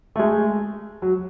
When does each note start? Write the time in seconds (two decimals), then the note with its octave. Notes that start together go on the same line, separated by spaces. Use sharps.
0.16 A3
0.19 G#3
1.02 F#3